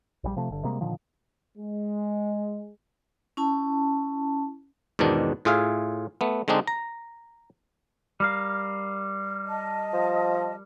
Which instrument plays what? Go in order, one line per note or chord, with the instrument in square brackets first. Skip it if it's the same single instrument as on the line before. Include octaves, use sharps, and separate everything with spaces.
[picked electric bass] A#1 C#3 G3
C3 F3 A3
G1 D3
C3 G3 G#3 A#3
A#2 D3 D#3 F3
[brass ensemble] G#3
[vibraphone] C#4 E4 A5
[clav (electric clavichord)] E2 G#2 B2 D#3 D4
A2 F4 G#4 E5 F5
A3 B3
D3 G#3 C4 D4 D#4
A#5
[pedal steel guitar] G3 A#4 F5
[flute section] D#5 A5
[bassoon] F3